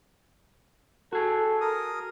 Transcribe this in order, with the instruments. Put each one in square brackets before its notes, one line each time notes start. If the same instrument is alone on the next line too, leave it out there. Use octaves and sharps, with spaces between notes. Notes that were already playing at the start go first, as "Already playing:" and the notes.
[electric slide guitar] F#4 G#4 [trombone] A4
[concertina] A#4 D#6